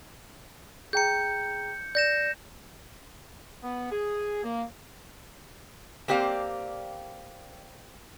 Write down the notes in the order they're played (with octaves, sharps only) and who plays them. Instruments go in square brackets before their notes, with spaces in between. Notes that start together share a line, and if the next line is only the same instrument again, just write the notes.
[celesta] G#4 G5 A#5 [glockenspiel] G6 C#7
[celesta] D5 [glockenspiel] G6 A#6 E7
[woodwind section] B3
G#4
A#3
[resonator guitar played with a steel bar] A#3 C4 G4 D5 F5